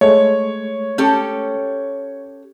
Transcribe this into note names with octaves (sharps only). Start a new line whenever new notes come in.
G#3 A3 C#5
C#4 G4 A4